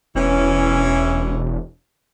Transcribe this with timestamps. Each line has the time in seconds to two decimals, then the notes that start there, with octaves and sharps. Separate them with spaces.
0.15 E1 E3 C#4